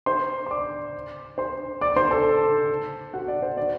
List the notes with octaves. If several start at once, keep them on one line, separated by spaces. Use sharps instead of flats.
C5 C6
C6
D5 D6
C5 C6
D5 D6
C5 C6
A4 A5
F#4 F#5
D5
C5
D5